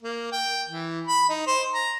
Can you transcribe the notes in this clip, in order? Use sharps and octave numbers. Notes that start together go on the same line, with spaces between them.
A#3
G5
E3
B5
D#4
C5
A#5